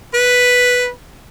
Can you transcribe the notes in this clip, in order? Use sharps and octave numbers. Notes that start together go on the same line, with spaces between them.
B4